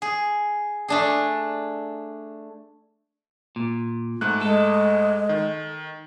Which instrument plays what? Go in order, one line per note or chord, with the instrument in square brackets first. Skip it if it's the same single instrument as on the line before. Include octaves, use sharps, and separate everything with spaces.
[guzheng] G#4
A3 D4 G#4
[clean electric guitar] A#2
[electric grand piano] G#2 A3 F#6
[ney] G#3 [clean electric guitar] A4
[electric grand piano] D#3